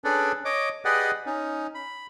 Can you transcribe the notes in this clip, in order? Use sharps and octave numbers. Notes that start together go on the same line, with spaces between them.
C#4 D4 G#4 A4 B4 D5
C#5 D#5 D6
G4 G#4 B4 D5 D#5 F#5
C#4 D#4
B5